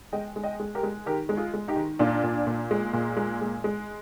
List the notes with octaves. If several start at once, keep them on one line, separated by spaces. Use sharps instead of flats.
G#3 D#5 G5
G#3
D#5 G5
G#3
G4 A#4
G#3
D#3 G4 A#4
G#3
F4 G#4
G#3
D#4 G4
D#3
A#2 D4 F4
A#2
A#2
G#3
A#2
G#3
G#3
G#3